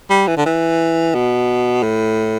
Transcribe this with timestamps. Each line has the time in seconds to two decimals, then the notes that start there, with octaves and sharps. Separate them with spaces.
0.10 G3
0.27 E3
0.37 D3
0.46 E3
1.15 B2
1.83 A2